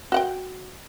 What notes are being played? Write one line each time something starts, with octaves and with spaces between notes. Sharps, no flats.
F#4 F#5 G5